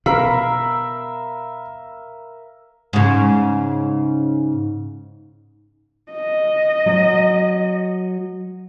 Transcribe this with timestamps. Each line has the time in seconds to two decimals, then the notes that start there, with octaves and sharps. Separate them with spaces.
0.06 B2 A#4 E5 F5 A#5 B5
2.93 G#2 C#3
6.12 D#5
6.86 F#3